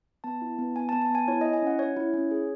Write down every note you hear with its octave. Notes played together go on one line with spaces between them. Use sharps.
B3 A5
E4
B3
B3 G#5
A5
B3
A5
B3 G#5
E4 C#5
E4 D#5
G#5
C#4 F#5
C#4 C#5
E4
C#4
G#4